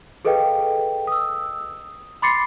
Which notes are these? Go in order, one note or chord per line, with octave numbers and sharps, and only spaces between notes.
G#4 A4 B4 D#5 F5 G5
D#6 E6
B5 C6 D6 A6 C7 C#7